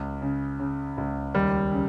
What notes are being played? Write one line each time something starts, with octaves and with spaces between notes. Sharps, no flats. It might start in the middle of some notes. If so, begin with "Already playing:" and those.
Already playing: C#2
C#3
C#3
C#2
D#2 G3
C#3